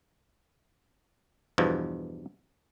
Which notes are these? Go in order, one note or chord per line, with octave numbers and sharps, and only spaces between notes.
E2 G2 B2 F3